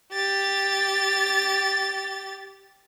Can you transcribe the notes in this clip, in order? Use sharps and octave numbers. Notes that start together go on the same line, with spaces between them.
G4 A6